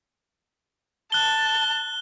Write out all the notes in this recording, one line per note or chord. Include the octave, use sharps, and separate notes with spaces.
A5 F#6 G7